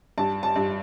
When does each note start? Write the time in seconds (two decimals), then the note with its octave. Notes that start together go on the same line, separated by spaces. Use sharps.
0.18 G2 A5
0.43 A5
0.56 G2